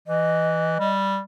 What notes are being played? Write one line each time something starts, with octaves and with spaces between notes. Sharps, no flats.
E3 D#5
G3